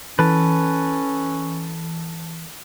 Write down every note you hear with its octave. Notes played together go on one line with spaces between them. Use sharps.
E3 C#4 A4 B4